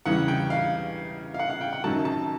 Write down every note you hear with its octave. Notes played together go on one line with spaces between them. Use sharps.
E2 C#3 E3 G3 F#5
G5
F5
F5
F#5
F5
G5
F#5
F#2 D#3 F#3 A5
A5